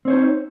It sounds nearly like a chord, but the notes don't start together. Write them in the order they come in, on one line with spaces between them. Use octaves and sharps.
C4 C#5 C5 D#4